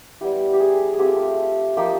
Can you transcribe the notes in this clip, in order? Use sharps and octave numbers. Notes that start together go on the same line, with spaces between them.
G3 B3 E4 G4
G4
G#4
G#4
A3 C4 F4 G4
F3 A#3 D#4 G4